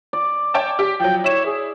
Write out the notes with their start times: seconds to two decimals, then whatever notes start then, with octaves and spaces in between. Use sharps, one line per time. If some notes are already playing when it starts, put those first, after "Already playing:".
0.13 D5
0.54 C#5 G5 A5
0.79 G4
1.00 F3 F#3 G5
1.24 E4 C#5 E7
1.46 G#4